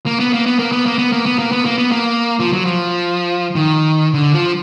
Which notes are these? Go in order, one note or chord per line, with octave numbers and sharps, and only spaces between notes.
A#3
B3
A#3
B3
A#3
B3
A#3
B3
A#3
B3
A#3
B3
A#3
B3
A#3
F3
F#3
F3
D#3
D3
F3